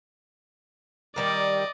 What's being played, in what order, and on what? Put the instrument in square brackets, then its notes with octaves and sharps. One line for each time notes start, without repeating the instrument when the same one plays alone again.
[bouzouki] D#3 G3 A#4 [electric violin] D5 D#5